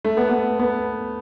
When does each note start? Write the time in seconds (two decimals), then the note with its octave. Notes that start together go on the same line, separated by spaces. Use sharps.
0.05 A3
0.17 B3
0.29 B3
0.59 B3